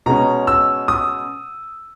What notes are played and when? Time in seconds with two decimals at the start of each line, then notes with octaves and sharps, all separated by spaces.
0.06 B2 G#3 C#4 A#5
0.47 E6
0.88 D#6